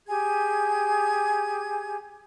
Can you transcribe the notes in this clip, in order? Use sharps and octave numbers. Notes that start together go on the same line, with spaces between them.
G4 G#4 G#5 G#6